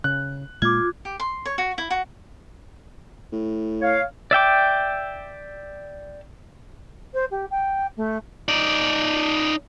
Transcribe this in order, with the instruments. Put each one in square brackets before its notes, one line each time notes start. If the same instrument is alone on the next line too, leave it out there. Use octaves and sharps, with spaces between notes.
[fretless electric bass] C#3 [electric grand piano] F#6
[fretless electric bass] A#2 G#3 A#3 [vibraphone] F4 [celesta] D6 G#6
[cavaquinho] G4
C6
C#5
F#4
E4
F#4
[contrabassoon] A2
[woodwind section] C#5 F5
[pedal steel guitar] D5 E5 G5 D6
[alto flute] C5
G4
G5
A3
[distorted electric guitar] D#4 D5